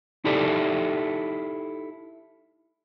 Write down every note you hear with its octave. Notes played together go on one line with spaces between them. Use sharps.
D#4 E4 G4 A4 D5 E5